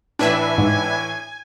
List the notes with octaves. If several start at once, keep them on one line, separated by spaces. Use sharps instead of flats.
A2 E3 D4 B4 E5 G#5
G#2